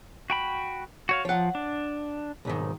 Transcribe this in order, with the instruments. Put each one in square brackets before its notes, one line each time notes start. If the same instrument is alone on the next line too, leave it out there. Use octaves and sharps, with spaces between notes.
[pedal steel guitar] F#4 G5 B5
F#4 C#5 F5
[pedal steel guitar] F3 [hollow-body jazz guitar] C#5 F#5
[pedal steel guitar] D4
[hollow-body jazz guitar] B1 G#2 D#3